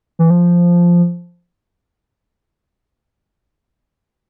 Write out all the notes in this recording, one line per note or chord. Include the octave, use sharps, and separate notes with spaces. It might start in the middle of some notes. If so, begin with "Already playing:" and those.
E3
F3